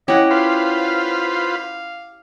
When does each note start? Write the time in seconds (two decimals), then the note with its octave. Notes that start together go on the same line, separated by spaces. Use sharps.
0.08 C#4 E4 G4 D#5 F#5
0.31 F4 B4 C5 F5